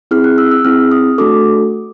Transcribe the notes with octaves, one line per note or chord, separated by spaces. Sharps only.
C4 E4 G#4 F6
F#6
E6
E6
C4 E4 G#4 F6
D#6
A3 D4 F#4 A4 D6